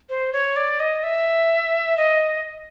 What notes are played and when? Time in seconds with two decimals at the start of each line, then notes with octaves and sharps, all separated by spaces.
0.10 C5
0.33 C#5
0.56 D5
0.80 D#5
1.03 E5
1.97 D#5